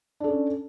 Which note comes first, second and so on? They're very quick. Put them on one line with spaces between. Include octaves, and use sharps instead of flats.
D4 A4 C#4